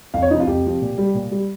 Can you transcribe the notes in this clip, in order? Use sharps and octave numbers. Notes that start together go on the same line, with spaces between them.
F2 F5
C#5
C3 F3 D#4
F4
F2 G4
C3 F3
A#2
G3
A#2
G3